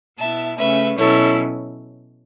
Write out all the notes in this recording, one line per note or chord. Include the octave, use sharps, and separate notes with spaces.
B2 B3 E4 E5 A5
C#3 A3 C#4 B4 E5
B2 F#3 C#4 E4 A4 C#5